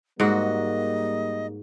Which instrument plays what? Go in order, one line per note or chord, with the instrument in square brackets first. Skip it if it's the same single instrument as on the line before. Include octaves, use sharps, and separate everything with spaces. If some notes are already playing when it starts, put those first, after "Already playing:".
[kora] G#2 F#4 [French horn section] G3 A#3 [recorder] D#5